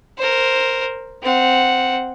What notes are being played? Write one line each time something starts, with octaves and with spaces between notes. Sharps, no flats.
A#4 C5
C4 F#5